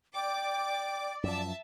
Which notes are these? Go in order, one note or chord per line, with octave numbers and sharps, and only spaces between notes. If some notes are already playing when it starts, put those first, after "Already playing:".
D5 G5 D6
F#2 F3 E5 A5